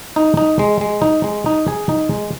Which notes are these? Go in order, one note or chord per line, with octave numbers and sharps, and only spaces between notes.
D#4
D#4
G#3
G#3
D#4
G#3
D#4
G#4
D#4
G#3